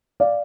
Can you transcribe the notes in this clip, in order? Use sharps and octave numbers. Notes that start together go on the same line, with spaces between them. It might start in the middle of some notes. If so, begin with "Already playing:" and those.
D5 F5